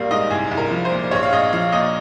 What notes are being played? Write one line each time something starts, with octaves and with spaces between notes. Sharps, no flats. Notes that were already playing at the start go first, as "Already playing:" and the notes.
Already playing: A#1 G3 A#3 A#4 F5
G#2 D#5
C2 G#4
C2
A#4
F3
C5
A#2
A#1 C#5
F5
A#1 D#5
F3 F5
A#2 D#5